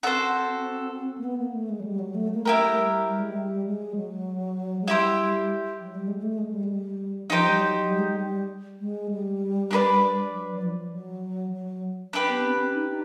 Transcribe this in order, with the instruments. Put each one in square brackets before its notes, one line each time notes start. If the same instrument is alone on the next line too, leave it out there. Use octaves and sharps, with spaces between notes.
[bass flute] C4 [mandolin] F#4 A4 C5
[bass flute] A#3
B3
A#3
A3
G#3
F#3
G3
F#3
A3
A#3
[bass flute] A3 [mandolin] E4 G4 A#4
[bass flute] G3
G3
G#3
G3
G#3
F#3
G#3
[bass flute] G3 [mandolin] E4 G4 C5
[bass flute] F#3
G3
G#3
G#3
A3
G#3
G3
G#3
G3
[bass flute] F3 [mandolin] D#4 G4 C5
[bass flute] G3
F#3
G3
G#3
G3
G#3
G3
[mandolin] D4 G4 B4 D5
[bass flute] F#3
F#3
F3
F#3
F#3
[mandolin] D4 G4 B4
[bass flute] B3
C4
C#4
D#4
D#4